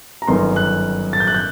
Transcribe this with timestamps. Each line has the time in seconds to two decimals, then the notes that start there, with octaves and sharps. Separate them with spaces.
0.22 A#5
0.28 G1 F#2 D#3 C6
0.56 F#6
1.13 A6
1.20 G6
1.27 F#6
1.35 G6